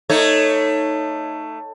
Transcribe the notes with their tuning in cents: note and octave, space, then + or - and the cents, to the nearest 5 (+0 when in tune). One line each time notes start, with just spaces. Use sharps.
A3 +15 D#4 +0 C#5 +0